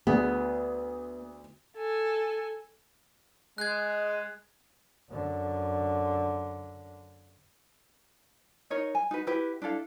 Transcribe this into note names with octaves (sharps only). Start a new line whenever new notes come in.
D2 B3 G#4
A4 G#5
G#3 F#6 G#6
F#2 D3
D#4 A#4 C#5 D#5
G#5
D#4 F#4 B4
E4 F#4 G4 B4
D4 E4 A4 F5